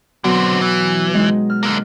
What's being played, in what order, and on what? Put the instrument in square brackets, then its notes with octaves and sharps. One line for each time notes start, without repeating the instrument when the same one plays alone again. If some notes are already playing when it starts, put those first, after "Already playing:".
[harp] B2 F#3 [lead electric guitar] D3 C4
[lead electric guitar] E3
[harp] G#3 D#4
F6
[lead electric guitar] D3 A#3